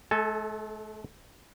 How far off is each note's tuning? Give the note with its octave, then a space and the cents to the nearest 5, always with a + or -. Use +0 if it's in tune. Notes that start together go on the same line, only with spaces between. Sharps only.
A3 -45 A4 +0 G#5 +30